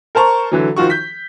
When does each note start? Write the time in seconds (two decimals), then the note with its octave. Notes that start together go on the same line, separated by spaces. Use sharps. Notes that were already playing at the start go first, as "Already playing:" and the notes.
0.15 A#4 C5 A5 A#5 C#6
0.52 D3 E3 F#3
0.77 D#3 F3 F4 F#4 C#6
0.90 G6 B6